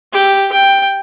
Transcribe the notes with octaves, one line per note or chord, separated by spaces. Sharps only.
G4
G5